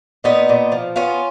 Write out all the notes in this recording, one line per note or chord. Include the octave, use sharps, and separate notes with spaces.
A#2 B3 D#4
A#2
F3
B3 C#4 F4